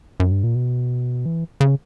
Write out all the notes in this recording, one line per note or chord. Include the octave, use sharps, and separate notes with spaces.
F#2
G2
A#2
B2
E3
C#3